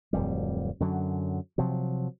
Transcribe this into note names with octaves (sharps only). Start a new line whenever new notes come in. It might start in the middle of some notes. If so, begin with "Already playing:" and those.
D1 F2 G3
F#2 D3 F#3
C3 F3 F#3